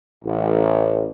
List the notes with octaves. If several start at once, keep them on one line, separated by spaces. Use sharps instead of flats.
A1